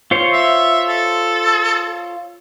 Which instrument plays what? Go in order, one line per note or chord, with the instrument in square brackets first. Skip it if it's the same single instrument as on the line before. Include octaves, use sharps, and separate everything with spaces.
[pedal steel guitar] F4 C5 C#5
[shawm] E5
A4